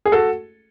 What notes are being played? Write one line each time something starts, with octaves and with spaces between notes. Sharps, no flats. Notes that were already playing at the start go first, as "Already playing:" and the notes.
G#4
F#4 A4